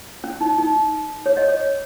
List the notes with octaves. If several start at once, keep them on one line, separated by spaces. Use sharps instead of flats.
C#4
D#4
D#4
C#5
D#5
C#5